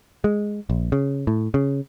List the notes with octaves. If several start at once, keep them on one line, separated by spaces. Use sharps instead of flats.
G#3
A#1
C#3
A2
C#3